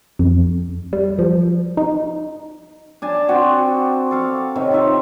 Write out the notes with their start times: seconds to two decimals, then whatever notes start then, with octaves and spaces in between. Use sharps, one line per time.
0.19 F2
0.93 G3
1.19 F3
1.77 D#4
3.02 D4 G#5 A5
3.28 C4 F#4 F#5 G5
4.11 A4 F5 C#6
4.55 C3 D#3 C#5
4.71 D#4 F4 E5 F5